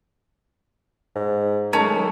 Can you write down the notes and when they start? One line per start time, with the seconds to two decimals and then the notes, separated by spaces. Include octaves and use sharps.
1.16 G#2
1.73 D#3 F#3 G#3 A3 C#4 A5 A#5